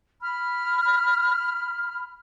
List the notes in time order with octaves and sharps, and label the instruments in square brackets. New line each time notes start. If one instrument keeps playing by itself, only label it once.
[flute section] B5 F6